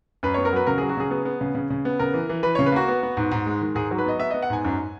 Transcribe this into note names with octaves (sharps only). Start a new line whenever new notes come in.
F#2 B4
B3 C#5
A#4
F#3 B4
C#3 A#4
F#3 G#4
F#4
C#3 G#4
B3 G#4
B3
C#3
C#3
C#3
B3
C#3 A#4
E3
E3
E3 B4
C#3 C#5
B4
A#3 F#4
B3
B3
G#2
G#2
G#3
D#3
G#2 G#4
F#3
B4
B3 D#5
B3 E5
B3 D#5
F#5
G#2 G#5
F#2